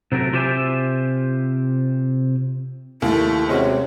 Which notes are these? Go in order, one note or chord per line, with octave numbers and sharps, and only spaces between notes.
C3 F#3 A3 A#4
C3 F4 G4 C5 E5 G#5
D#2 A3 E4
C3 G#3 C#4 F#4 C#5